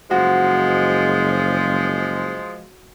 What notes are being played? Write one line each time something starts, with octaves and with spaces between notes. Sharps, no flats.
F#1 F3 G#3 F#4